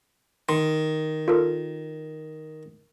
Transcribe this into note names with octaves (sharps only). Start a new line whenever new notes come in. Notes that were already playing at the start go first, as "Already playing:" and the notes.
D#3 C6
F4 A4 A#4